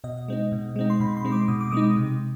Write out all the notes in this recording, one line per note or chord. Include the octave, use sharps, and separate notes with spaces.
B2 D#5
G#3 C4 D#4
B2
G#3 C4 D#4
C6
B2 B5
C6
G#3 C4 D#4
D6
B2 D#6
D6
G#3 C4 D#4 D#6
C3